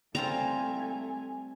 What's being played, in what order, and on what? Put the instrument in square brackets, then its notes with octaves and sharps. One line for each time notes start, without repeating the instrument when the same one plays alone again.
[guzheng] G3 C4 F4 [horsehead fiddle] A3 G#5 [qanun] A#5